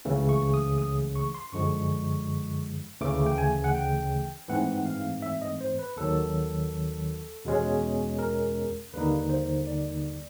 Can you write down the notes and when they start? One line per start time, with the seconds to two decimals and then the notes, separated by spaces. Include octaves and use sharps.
0.05 C#2 C#3 E3 A3
0.29 C#6
0.54 D#6
0.78 D#6
1.15 C#6
1.35 C6
1.52 F#2 D3 F3 G#3 C#6
3.01 D2 C#3 E3 A3 D6
3.26 G5
3.38 G#5
3.64 F#5
3.75 G5
4.49 G#2 E3 A3 C4 F#5
4.86 F5
5.22 E5
5.42 D#5
5.61 C5
5.79 B4
5.96 D#2 D#3 F#3 A4
7.45 E2 B2 G#3 C#4
8.19 A#4
8.93 D#2 D3 G3 A#3 D#4 B4
9.30 C5
9.67 D5